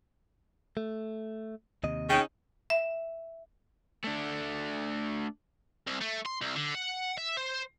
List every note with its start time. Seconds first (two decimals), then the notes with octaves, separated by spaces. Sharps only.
0.77 A3
1.84 D#2 C3 D#5
2.10 C#3 C#4 D#4 G5
2.70 E5
4.04 A3 D4
5.87 C2
6.01 A3
6.26 C6
6.42 C2
6.56 D3
6.75 F#5
7.18 E5
7.37 C5